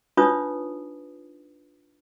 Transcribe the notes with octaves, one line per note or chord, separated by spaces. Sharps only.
D4 D#4 F4 B4 C#5 D#6